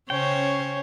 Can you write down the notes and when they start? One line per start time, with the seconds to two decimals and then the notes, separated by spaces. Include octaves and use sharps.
0.10 C#3 C#4 C5 C#5 G5